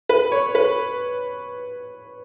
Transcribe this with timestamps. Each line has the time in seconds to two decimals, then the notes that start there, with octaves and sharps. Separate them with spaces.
0.09 B4
0.32 C#5
0.55 B4